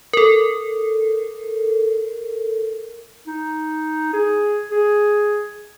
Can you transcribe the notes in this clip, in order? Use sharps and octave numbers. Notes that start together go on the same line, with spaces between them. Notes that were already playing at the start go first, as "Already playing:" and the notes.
A4 A#4
D#4
G#4
G#4